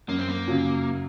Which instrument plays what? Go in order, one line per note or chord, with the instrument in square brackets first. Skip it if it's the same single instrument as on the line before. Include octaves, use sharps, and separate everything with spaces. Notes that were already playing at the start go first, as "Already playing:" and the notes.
[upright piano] F#2 [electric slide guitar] A#3
[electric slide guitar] C4
A#3
[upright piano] C#3 F#3